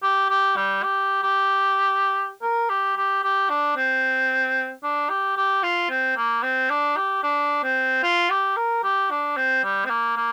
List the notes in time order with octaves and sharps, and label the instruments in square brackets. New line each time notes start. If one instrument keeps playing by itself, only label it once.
[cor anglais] G4
G4
G3
G4
G4
A#4
G4
G4
G4
D4
C4
D4
G4
G4
F4
C4
A#3
C4
D4
G4
D4
C4
F4
G4
A#4
G4
D4
C4
G3
C4
A#3
A#3